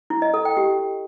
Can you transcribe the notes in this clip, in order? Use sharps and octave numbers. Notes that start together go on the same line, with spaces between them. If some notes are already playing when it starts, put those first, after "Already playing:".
E4
D#5
A4
G5
G4